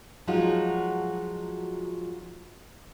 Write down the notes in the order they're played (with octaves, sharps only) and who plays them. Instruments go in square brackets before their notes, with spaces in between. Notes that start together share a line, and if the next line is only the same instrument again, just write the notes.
[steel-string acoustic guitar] F3 F#3 G#3 D#4 F4 F#4